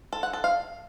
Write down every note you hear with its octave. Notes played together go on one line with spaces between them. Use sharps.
A4
F#5
A4
F5